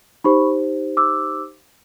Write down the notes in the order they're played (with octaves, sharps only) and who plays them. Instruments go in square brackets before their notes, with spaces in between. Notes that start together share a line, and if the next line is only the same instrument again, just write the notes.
[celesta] D#4 G4 C5 B5 C#6
D6 E6